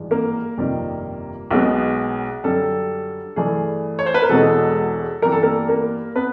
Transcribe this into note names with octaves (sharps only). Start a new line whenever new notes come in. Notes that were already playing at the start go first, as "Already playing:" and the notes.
Already playing: G#1 G2 E3 G#3
A#3 A#4
G1 F2 C3 D#3 G3
B1 B2 G#3 B3
F#2 D3 G3 A4
G2 E3 A3 G#4
C#5
C5
B4
A#4
E1 E2 B2 G#3 A4
G2 E3 G3 B3 A#4
A4
A#3 A#4
A#3 A#4
B3 B4